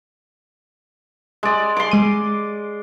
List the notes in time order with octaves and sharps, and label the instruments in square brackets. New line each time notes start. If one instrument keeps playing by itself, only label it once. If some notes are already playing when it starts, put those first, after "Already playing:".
[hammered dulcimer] G#3 D5
C6 D6
[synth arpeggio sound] G#3 D#7